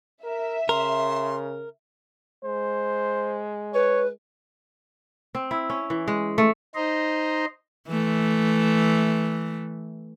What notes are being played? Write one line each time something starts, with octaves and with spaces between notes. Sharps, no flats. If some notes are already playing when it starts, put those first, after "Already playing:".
A#4 E5
C#3 A#4 C6
G#3 C5
B4 C#5
C4
E4
C#4
E3
G#3
A3
D#4 C5 D#5 A#5 C6
E3 A3